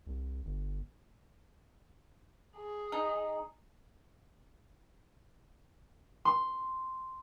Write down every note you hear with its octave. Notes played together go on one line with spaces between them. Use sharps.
C2
G1
G#4
D#4
C6